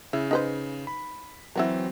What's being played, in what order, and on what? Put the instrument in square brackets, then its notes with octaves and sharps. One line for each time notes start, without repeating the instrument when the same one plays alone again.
[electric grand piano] C#3 [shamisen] E4
[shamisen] D#4 B4 C5
[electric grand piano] B5
[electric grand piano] E3 F#3 C4 [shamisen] E4 F#4 A#4